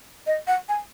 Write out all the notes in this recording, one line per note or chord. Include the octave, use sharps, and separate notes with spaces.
D#5
F#5
G#5